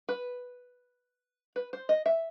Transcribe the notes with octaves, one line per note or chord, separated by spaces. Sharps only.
B4
B4
C5
D#5
E5